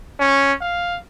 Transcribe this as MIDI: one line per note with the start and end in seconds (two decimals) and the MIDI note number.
0.20 0.54 61
0.61 0.99 77